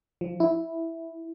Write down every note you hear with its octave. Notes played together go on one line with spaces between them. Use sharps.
F3
E4